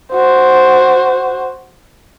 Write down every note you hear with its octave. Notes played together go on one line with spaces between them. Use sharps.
F#4 C5